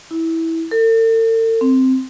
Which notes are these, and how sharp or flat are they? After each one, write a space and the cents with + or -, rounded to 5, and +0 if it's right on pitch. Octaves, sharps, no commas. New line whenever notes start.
E4 -15
A4 +45
C4 -5